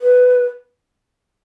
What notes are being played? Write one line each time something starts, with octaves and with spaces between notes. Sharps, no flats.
B4